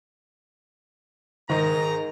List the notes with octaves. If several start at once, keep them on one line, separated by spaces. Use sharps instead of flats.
G#2 D#3 A#5